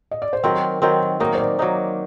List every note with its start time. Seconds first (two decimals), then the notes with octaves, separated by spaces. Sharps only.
0.11 D#5
0.22 D5
0.33 C5
0.44 D#3 F#3 C4 A#4
0.82 D#3 F#3 C4
1.20 F#3 A#3 D#4 A#4
1.35 C5
1.40 D5
1.59 F#3 A#3 D#4